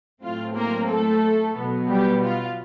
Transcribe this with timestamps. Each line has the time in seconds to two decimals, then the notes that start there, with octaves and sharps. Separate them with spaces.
0.21 A2 F#3 A3 C4 F4
0.55 A#3 A#4
0.88 A3 A4
1.56 B2 F#3 B3
1.89 G3 G4
2.23 F4